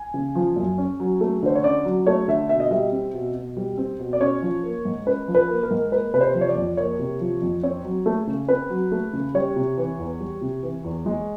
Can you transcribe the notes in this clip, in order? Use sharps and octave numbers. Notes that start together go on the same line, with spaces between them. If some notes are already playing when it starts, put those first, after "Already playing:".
Already playing: G#5
C#3
F3
F#2
C#4
F#3
A3
D3 C5
C#5
C#4 D5
F#3
A3 C#5
D3 E5
B2 E5
D#5
G3 E5
C4
B2
B2
G3
C4
B2
D5
C#4 C#5
F3
A#3
G#2
C#4 B4
F3
B4
A#3
A#4
G#2
A#3 B4
C3 B4
C5
F3
C#5
D5
F2
A#3 C#5
C3
F3
F2
C4 C#5
F#3
A3
C#3
C4 B4
F#3
A3
C#3
G3 C#5
C3
E3
E2
G3
C3
E3
E2
G#3